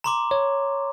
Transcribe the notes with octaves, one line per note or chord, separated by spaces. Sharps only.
A#5 C6 D6
C#5